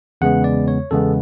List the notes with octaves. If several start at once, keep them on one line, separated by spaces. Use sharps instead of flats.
E2 C#3 G#3 B3 F#5
D5
C#5
E2 C#3 G#3 B3 A4